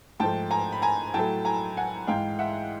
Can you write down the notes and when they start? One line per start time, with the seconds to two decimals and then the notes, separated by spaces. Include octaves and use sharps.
0.20 G#2 F3 A3 G5 A5
0.51 G#5 A#5
0.72 B5
0.82 G#5 A#5
1.14 A2 F#3 A3 G5 A5
1.45 G#5 A#5
1.77 F#5 G#5
2.07 G#2 E3 G#3 F5 G5
2.39 E5 F#5